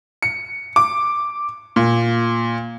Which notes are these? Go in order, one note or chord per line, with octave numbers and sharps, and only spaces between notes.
C#7
D6
A#2